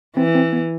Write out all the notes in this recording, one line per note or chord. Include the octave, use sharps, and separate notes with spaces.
E3 C4
C4
B3